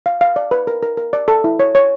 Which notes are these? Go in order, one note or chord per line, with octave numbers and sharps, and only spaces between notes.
F5
F5
D5
B4
A#4
A#4
A#4
D5
A4
E4
C#5
C#5